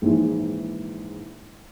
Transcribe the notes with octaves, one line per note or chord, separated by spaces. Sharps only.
A#1 G#2 E3